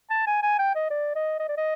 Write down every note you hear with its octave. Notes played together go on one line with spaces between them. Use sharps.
A5
G#5
G#5
G5
D#5
D5
D#5
D#5
D5
D#5